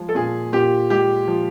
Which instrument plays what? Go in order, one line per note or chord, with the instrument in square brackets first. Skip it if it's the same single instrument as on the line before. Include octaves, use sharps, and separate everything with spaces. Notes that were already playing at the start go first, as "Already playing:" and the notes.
Already playing: [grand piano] F3 G#3
[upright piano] A4
[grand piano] A#2 [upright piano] G#4
[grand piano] A#2 [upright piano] G4
[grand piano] G#3 [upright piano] G4
[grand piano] F3